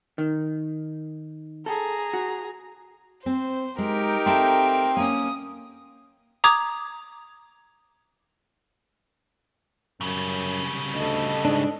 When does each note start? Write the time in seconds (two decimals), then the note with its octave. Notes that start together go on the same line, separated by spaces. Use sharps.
0.18 D#3
1.66 G#4 A4 A#5
2.13 F#4
3.26 C4 C5
3.78 G#3 D#4 G4 A#4
4.26 A3 C4 A4 A5
4.97 A#3 C#4 D#6
6.44 A#5 D6 D#6 G#6
10.01 F#2 C#3 G3
10.94 D2 A4 D#5
11.45 G#2 D4